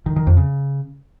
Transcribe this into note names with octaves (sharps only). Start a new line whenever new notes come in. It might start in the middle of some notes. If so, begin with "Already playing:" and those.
D#3
D#3
F2
C#3